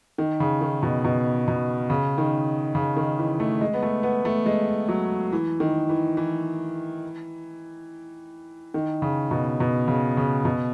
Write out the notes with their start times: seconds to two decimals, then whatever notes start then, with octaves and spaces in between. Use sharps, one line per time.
0.18 D#3
0.40 C#3
0.61 D#3
0.83 B2
1.04 B2
1.48 B2
1.90 C#3
2.18 D#3
2.75 C#3
2.97 D#3
3.19 E3
3.40 A3
3.61 G#3
3.74 B3
3.83 A3
4.03 B3
4.25 A3
4.46 G#3
4.89 F#3
5.32 E3
5.60 D#3
5.89 E3
6.17 E3
8.74 D#3
9.02 C#3
9.31 B2
9.60 B2
9.88 C#3
10.17 C#3
10.45 B2